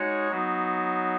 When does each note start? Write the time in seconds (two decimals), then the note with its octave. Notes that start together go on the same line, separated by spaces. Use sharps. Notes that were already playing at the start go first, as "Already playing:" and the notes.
Already playing: G#3 D#4 F#4 C#5
0.31 F#3 B3 D#4 F#4